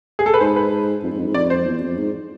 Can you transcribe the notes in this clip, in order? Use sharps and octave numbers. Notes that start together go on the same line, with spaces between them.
G#4
A4
B4
G#2 C5
B4
F2
G#2
F2
G#2
F2 D5
C5
E2
F2
G#2